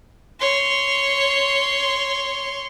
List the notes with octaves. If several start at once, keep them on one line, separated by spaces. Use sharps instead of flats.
C#5 C6